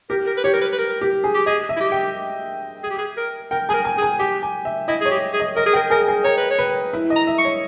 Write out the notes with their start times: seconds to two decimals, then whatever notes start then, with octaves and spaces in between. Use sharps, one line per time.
0.10 G4 A#4
0.27 A#4
0.37 B4
0.44 G4 C#5
0.54 A#4
0.62 B4
0.72 B4
0.78 A#4
1.01 G4
1.24 G#4
1.34 G4
1.46 G#4 D#5
1.69 E5
1.76 E4
1.80 G4
1.92 G5
2.83 G#4
2.90 G4
2.98 G#4
3.17 A#4
3.51 A#4 G5
3.69 G#4 G#5
3.74 A#4
3.85 G#5
3.98 G#4
4.02 G#5
4.19 G4 G5
4.43 G#5
4.65 E5
4.88 E4 D#5
5.01 G#4 C#5
5.11 G4
5.33 G#4
5.40 D#5
5.56 A#4 D#5
5.66 G#4
5.73 A#4 G5
5.90 G#4 A#4
6.08 G#4
6.24 A#4 C#5
6.37 B4
6.50 C#5
6.59 B4
6.93 E4
7.10 D#5
7.16 A#5
7.27 E5
7.38 C#6
7.45 C#5